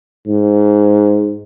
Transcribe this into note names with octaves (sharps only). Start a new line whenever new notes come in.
G#2